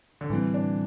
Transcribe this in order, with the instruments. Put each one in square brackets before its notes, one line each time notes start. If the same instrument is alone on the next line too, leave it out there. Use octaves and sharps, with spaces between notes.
[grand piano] D3
[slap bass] A2 G3 C4 [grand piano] E3
[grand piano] D4